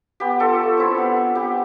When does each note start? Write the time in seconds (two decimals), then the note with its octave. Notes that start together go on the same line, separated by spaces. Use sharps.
0.20 B3 G4
0.40 D4 F4 A4
0.59 A3
0.78 C4 E4
0.97 B3
1.17 E4
1.35 B3 G4